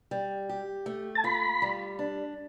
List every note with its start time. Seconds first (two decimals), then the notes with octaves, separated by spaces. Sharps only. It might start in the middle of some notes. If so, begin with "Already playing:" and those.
0.11 G3
0.49 G4
0.86 A3
1.15 A5
1.24 F4 B5
1.62 G3
1.99 D4